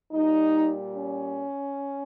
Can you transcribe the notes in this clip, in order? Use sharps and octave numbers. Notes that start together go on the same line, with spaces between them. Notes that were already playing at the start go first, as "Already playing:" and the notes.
A#2 G3 D#4
C#4